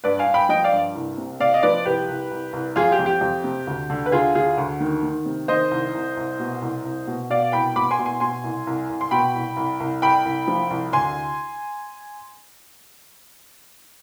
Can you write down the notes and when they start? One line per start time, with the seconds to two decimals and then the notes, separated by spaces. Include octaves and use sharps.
0.04 G2 B4 D5
0.19 F5 G#5
0.27 G2
0.34 G5 B5
0.49 F3 D#5 G5
0.64 D5 F5
0.72 G2
0.95 C2
1.18 C3
1.40 C3 D5 F5
1.54 D#5
1.63 F3 B4 D5
1.85 C2 G4 B4
2.08 C2
2.31 C2
2.53 C2
2.76 F2 F4 G#4
2.92 G4
2.99 F2
3.06 G4
3.21 F2
3.44 C3
3.67 D2
3.90 D3
4.06 B4
4.12 D2 F4 G#4
4.35 D3 F4 G#4
4.58 D2
4.80 D#3
5.03 D#3
5.26 C3
5.48 D#3 C5 D#5
5.71 C2
5.94 C2
6.17 C2
6.39 B2
6.62 C2
6.85 C2
7.07 B2
7.30 B2 D5 F5
7.52 C2 G5 B5
7.76 B2 B5 D6
7.91 G#5 C6
7.98 B2
8.06 G#5 C6
8.20 B2 G#5 C6
8.44 C2
8.67 C2
8.89 C2
9.01 C6
9.11 B2 G5 B5
9.34 C2
9.57 C2
9.80 C2
10.02 C2 G5 B5
10.25 C2
10.48 F3
10.70 C2
10.93 D2 G#5 C6